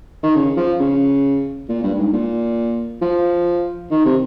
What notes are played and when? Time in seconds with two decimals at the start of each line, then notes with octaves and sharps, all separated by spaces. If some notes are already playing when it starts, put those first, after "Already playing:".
0.23 D#3
0.35 C#3
0.57 F3
0.80 C#3
1.69 A#2
1.83 G2
1.94 G2
1.98 G#2
2.13 A#2
3.02 F3
3.91 D#3
4.05 C3